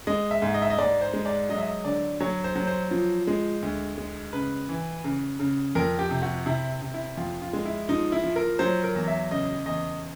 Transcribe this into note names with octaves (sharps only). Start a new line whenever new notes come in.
G#3 D#5
E5
G#2
D#5
E5
D#5
G#2 D5
C5
G#3
D5
F#3 D#5
E5
D#5
D3 D5
F#3 C#5
C5
F#3
C5
F3
G#3
D2
G#3
C#3 B4
E3
C#3
C#3
F2 A#4
G4
C3
F#4
C3 E4
C3
E4
F2 F4
F4
G#3
E4
F3 D#4
E4
F3
A#4
F#3 C5
A#4
E2
E5
C#3 D#5
E2 D#5